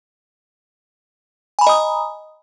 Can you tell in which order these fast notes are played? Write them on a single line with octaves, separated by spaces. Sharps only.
G#5 B5 A#5 D#5 D#6